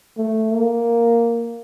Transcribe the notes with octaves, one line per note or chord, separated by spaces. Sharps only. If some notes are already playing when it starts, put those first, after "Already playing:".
A3
A#3